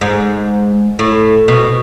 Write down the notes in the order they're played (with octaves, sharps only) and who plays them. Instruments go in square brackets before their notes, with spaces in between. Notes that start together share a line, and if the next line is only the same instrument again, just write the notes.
[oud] G#2
A2
B2